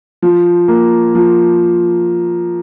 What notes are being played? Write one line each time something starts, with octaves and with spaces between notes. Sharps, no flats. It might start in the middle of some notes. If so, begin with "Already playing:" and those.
F3
A#3
F3